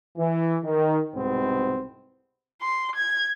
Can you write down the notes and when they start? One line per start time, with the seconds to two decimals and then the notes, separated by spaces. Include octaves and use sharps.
0.17 E3
0.64 D#3
1.15 C2 G#2 B2 B3 C4
2.61 C6
2.95 G#6